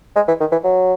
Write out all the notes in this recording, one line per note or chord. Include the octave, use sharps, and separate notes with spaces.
G#3
E3
D#3
E3
F#3